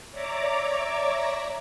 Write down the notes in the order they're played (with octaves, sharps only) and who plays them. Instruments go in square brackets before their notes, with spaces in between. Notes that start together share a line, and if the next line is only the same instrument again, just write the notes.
[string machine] C#5 D5 E5 A#5 D6